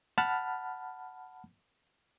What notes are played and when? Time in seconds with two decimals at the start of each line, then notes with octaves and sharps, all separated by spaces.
0.18 F#5 A5 B5 F6